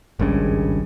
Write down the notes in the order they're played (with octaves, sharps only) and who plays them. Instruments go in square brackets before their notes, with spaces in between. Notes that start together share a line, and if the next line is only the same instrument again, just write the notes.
[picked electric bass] G#1 C#2 G2 C#3